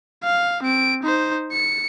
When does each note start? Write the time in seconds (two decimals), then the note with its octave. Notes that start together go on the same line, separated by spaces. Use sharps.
0.24 F5
0.63 C4 D7
1.03 D#4 C5
1.52 C#7